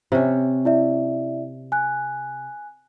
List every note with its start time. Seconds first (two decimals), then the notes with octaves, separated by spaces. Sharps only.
0.12 C3 C#4
0.65 E4 D5 E5
1.72 G#5 F#6